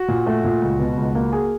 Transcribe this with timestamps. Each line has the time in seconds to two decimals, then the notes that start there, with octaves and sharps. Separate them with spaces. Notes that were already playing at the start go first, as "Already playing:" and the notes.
Already playing: F#4
0.08 A#2
0.26 A3
0.44 A#2
0.62 C#2
0.79 B2
0.97 C#2
1.15 A#3
1.33 G#4